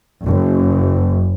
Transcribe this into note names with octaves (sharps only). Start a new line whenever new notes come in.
F#1